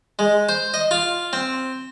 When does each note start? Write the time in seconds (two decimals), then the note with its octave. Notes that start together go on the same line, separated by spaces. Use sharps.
0.19 G#3
0.49 C5
0.74 D#5
0.91 F4
1.33 C4